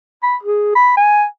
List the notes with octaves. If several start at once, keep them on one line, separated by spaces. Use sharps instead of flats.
B5
G#4
B5
G#5